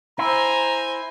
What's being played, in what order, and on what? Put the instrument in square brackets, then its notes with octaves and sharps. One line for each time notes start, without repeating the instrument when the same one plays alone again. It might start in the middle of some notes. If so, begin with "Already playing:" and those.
[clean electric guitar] E4 [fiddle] C5 G#5 [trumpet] A#5